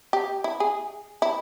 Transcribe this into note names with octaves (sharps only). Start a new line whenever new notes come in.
G4
E4
G#4
E4